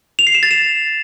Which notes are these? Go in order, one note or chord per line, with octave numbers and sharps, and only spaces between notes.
F7
C7
E7
A6
E7